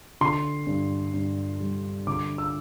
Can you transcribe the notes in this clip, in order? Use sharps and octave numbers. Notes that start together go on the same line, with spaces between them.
D3 C6
G2
G2
G3
D3 D6
E6